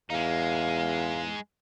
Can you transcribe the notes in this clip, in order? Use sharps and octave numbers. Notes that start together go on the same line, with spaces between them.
E2 G#3 D#4 F5